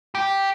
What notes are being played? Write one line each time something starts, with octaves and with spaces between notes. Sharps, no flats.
G4